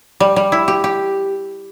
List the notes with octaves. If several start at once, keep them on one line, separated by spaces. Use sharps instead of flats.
G3
G3
E4
G4
G4